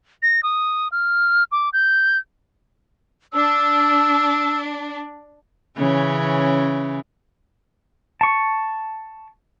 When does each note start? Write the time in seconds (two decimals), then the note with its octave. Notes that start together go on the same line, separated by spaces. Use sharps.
0.22 A#6
0.43 D#6
0.92 F6
1.52 D6
1.73 G6
3.33 D4 E6
5.78 C#3 E3 C#4
8.21 A5 C#6